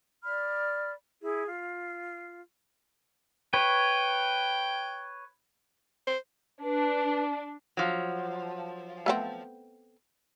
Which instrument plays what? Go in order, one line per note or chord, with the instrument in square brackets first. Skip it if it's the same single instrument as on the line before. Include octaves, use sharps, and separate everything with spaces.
[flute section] D5 B5 F6
E4 G#4
F4
[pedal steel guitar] B4 C#5 [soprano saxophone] G5
[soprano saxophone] C5
[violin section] D4 [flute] B4
[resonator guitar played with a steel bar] F3 F#3
[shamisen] A3 B3 C4